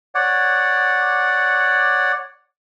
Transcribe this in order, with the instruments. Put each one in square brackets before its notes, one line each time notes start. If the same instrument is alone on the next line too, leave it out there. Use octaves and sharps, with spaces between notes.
[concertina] C#5 D5 F#5